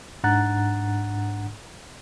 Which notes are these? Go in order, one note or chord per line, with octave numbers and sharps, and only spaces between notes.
G#2 D4 F#5 A#5 F#6 A6